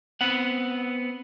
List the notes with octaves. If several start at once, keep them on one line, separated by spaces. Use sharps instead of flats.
B3 C4 F#5